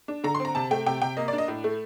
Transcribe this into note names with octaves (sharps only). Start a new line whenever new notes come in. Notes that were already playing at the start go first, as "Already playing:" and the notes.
D4
D3 A#5
C6
C4
A#5
C3 A5
A3 G5
C3 G5
C3 G5
A#3 D#5
D5
D4
D#5
A2
A3